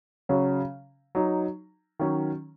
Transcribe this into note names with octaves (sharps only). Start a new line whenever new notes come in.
C#3 F#3 C#4
F#3 D#4
D#3 F#3 C#4